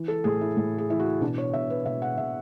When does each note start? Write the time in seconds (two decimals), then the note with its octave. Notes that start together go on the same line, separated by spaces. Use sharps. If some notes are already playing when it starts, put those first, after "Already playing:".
Already playing: E3
0.08 A4
0.24 A2 G#4
0.41 E4
0.57 A2
0.78 G#4
0.89 E3 E4
0.99 F#4
1.21 B2 D4
1.38 C#5
1.53 B2 E5
1.70 B4
1.85 B2 E5
2.02 F#5
2.17 B2 E5